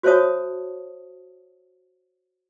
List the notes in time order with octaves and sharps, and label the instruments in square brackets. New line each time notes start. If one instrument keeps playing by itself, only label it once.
[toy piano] F#4 C5 C#5 E5 A5 D#6